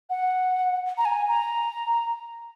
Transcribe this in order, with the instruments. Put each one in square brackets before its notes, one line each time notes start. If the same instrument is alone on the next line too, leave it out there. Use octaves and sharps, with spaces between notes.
[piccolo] F#5
A#5
G#5
A#5